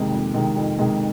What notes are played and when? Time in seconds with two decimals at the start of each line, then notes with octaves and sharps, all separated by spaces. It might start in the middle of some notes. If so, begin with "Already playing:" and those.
Already playing: F2 C3 D#3 G#3
0.12 F2
0.34 C3 D#3 G#3
0.57 F2
0.79 C3 D#3 G#3